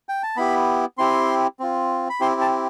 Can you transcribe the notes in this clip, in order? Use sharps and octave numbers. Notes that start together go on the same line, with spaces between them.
G5
A5
B3 E4 G4 B5
C4 E4 G4 C6
C4 F4
B5
C4 E4 G4 C6
A5